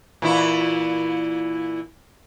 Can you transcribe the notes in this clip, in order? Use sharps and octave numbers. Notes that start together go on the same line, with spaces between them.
A#2 E3 E4